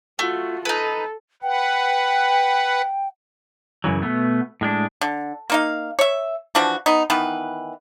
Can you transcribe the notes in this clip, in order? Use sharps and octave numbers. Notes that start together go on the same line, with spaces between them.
A3 F4 F#4
D#4 A4 B4
B4 F#5 G5
F#2 C#3 E3 F#3
B2 A3 B3
A2 G#3 D4
D3
A#3 D#4 F5
C#5 E5
E3 F3 D4 F#4
B3 D#4
D#3 E3 B3 B4